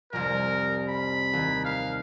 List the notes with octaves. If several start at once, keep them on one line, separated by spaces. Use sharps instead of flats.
F1 C2 A#4
B5
D#2
F5